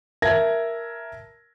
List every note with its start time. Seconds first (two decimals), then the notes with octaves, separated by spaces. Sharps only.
0.22 A#4 E5 A5 G#6 A#6